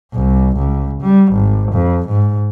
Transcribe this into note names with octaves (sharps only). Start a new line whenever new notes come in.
C2
C#2
G3
G#1
F2
G#2